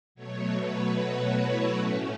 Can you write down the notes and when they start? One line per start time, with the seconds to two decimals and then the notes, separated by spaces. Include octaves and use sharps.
0.15 B2 F#3 A3 C#5
0.55 B4
0.96 F#4
1.36 E4
1.76 A2 A3 C#4